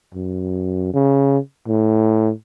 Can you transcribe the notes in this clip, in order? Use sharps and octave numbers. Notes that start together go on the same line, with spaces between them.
F#2
C#3
A2